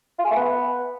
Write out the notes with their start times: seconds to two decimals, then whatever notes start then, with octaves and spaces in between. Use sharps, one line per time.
0.19 F4
0.25 G#4
0.31 A3
0.36 B3